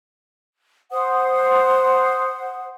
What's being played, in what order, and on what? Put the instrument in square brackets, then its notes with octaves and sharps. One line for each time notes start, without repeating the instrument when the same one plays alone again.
[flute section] C5 F#5 D#6